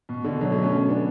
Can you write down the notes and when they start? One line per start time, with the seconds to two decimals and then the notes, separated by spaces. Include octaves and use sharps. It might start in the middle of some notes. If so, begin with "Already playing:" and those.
0.09 B2
0.24 B2 D3
0.41 D3 F#3
0.51 F#3 A3
0.62 A3 C#4
0.89 B3 D4